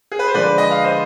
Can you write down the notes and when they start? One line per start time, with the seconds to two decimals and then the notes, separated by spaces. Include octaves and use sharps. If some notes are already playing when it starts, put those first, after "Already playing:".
0.12 G#4
0.19 B4
0.27 C5
0.34 D3 F3 G#3 B4 D5
0.58 D#5
0.71 F5
0.84 C5 D#5